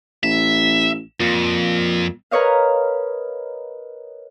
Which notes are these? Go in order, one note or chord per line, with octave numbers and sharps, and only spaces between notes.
A1 E5
F2 A#2
A#4 B4 C#5 D#5 F5